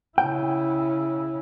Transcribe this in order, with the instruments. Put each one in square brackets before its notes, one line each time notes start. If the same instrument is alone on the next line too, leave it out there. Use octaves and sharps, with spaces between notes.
[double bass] C#3 E4 [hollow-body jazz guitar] G5